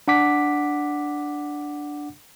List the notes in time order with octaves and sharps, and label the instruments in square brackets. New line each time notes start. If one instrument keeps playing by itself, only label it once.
[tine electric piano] D4 F#5 D6 B6